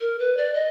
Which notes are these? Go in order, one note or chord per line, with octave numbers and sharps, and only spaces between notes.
A#4
B4
D5
D#5